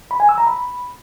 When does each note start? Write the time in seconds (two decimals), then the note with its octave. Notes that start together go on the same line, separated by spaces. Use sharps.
0.11 B5
0.20 G#5
0.29 E6
0.38 A#5
0.47 B5